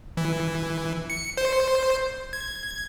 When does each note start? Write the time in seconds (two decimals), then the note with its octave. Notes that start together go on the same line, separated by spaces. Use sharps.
0.17 E3
1.10 C#7
1.37 C5
2.33 G#6